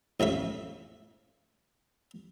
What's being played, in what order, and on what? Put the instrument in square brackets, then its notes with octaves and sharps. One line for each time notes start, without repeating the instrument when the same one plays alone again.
[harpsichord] A1 F2 C#3 E5